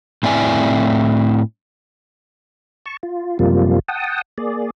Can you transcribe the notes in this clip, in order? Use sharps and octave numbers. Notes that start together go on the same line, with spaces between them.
A2 C4 E4 D5 G#5
A5 C#6
F4
F#2 C3 F3 G3 A#3 F4
F#5 G5 A5 D#6
A#3 G#4 D5